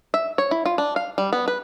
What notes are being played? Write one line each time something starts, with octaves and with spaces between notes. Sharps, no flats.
E5
C#5
E4
F4
D4
F5
G3
B3
B4